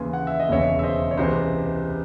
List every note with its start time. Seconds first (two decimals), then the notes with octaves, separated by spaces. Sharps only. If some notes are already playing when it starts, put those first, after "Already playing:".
Already playing: D#2 C#3 E3 G#5 C6
0.13 F#5
0.27 E5
0.40 D#5
0.49 E1 D#2 C#3 E3 C#5 E5
0.79 E5
0.83 C5 D#5
1.11 C#5
1.17 C#2 C3 E3 C5